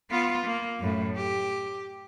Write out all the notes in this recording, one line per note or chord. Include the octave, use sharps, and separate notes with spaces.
B3 F4
A#3
F#2 A2
G4